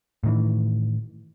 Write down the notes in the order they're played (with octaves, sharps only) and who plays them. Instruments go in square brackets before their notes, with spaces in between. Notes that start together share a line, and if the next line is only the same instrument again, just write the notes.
[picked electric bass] A2 D#3 E3